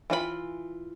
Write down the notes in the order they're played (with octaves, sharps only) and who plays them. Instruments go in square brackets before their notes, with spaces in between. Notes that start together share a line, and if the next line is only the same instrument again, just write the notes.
[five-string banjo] E3 F4 F#4 B5